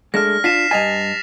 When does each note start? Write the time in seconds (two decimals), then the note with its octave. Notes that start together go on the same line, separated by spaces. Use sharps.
0.14 G#3 A3 D4 F6 A#6
0.44 D4 F4 B6 C7 E7
0.71 G2 D#5 G#5 A6 F7